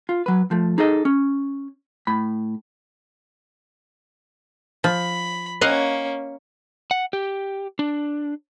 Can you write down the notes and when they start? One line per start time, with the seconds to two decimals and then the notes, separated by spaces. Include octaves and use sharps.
0.09 F4
0.26 F#3 B4
0.51 F3 A3
0.78 D#4 G#4 A4 D#5
1.05 C#4
2.07 A2 B5
4.84 F3 B5
5.61 A#3 C#4 D#5 F5 F#5
6.91 F#5
7.13 G4
7.79 D4